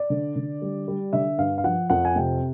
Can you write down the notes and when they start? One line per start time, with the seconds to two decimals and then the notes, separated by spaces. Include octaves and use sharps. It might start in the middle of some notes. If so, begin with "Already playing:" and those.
Already playing: D5
0.10 D3
0.36 D3
0.62 G3
0.88 G3
1.13 D3 E5
1.38 G2 F5
1.58 F5
1.64 F3 F#5
1.90 F2 F#5
2.05 G#5
2.16 C3 G5